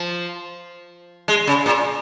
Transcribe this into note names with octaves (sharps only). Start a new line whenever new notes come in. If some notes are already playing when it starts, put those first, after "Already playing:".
Already playing: F3
G#3
C#3
A#2